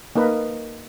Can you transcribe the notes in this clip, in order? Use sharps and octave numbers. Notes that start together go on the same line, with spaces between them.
A#3 D#4 A#4 B4